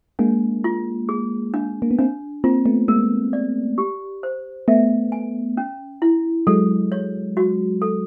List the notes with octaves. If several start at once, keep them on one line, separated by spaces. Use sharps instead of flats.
G#3 A#3 D4
F4
G#4
D4
A#3
B3
A#3 C4 D4
A#3 C4 F4
A3 B3
G#3 A#3 A#4
D5
G4
C5
A3 B3 E5
G#5
C#4
E4
F#3 G#3 A4
C#5
F#4
A4